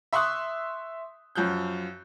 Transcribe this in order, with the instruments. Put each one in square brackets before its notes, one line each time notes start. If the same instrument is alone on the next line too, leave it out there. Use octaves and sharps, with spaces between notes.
[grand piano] E5 C6 C#6 D#6 F#6
F#2 F3 F#6 G6